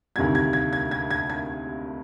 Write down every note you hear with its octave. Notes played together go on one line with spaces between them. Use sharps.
D2 C3 D#3 G3 G#6
G#6
G#6
G#6
G#6
G#6
G#6